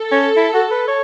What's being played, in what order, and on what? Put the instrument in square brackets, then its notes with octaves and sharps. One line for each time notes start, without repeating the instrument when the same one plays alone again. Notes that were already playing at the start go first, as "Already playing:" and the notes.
Already playing: [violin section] A4
[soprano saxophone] C#4
E4
F#4
B4
C#5